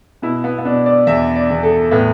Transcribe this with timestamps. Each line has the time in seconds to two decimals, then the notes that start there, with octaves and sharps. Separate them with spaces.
0.22 B2 E4
0.44 B3
0.58 B3
0.65 B2 D4
0.86 D5
1.07 E2 E5
1.36 D5
1.50 E2
1.63 A4
1.91 A2 B3